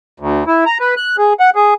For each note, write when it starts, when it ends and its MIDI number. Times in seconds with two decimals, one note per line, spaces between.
0.20 0.44 38
0.47 0.64 64
0.66 0.78 82
0.80 0.95 71
0.97 1.16 90
1.18 1.33 68
1.40 1.50 78
1.55 1.74 68